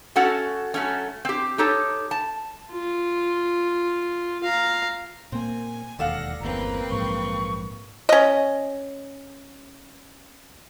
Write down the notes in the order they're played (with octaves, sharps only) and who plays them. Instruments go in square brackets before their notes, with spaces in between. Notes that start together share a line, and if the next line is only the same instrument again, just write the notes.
[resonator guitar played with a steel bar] A3 C#4 F#4 A4 F#5
F#3 A3 C#4
C4 G4
D#4 G4 A4 C#5
A5
[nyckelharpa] F4
F5 A#5
[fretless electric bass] A#2 A#3 [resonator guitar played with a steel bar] C4 [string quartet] G#5
[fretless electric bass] E1 D#2 [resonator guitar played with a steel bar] D4 A4 F5 [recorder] F#5 [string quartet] A#6
[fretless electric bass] G1 E2 [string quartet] A#3 C4 B4 [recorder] A#5
[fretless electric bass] A#1 G#2 F#3 [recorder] C#6
[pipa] C#4 D#5